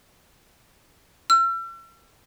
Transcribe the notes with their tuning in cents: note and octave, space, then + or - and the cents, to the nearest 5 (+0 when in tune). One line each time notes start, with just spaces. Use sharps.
E6 +45